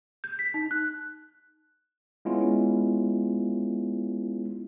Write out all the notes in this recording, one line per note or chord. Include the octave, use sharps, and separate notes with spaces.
G6
B6
D#4
F#6
G#3 B3 C#4 E4 F4